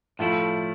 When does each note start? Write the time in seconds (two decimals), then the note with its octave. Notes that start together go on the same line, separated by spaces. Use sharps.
0.19 A2 F3 A3 E4 F4